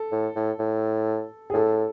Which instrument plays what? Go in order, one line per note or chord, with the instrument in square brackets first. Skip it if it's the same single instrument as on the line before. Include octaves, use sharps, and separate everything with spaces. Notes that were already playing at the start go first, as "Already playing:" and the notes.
Already playing: [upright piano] A4
[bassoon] A2
A2
A2
[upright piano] G#4
[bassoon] A2 [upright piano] A4